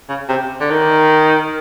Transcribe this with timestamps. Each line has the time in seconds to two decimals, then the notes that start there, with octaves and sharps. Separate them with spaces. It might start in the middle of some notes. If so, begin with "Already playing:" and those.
0.09 C#3
0.29 C3
0.60 D3
0.70 D#3